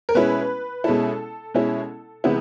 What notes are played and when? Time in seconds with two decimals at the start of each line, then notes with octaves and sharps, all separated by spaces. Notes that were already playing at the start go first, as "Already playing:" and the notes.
0.09 A#4
0.15 B2 G#3 C#4 E4 B4
0.84 B2 G#3 C#4 E4 A4
1.54 B2 G#3 C#4 E4
2.24 C3 E3 G#3 B3 E4